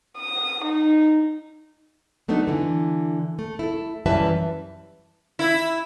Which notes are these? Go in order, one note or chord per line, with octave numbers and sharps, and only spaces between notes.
D#6
D#4
F#3 A3 B3 D4 D#4
D3 E3
A3
E4 A4
F#2 E3 G3 B4 E5 A5
E4